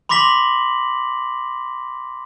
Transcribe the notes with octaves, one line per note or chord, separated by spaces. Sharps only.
B5 C6 D6 A#6 B6 F#7